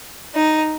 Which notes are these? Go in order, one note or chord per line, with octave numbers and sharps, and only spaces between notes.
D#4